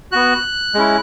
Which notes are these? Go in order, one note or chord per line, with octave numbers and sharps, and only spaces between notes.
B3 F#4 F#6
G#3 C#4 E4